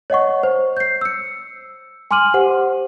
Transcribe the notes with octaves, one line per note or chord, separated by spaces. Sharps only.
C#5 D#5 F#5 C#6
C5
G6 C7
E6 C#7
G#5 C6 D6 F6 D#7 F#7
G4 C5 F#5